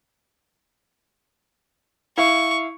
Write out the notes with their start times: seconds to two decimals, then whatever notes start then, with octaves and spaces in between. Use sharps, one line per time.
2.18 E4 F5 C#6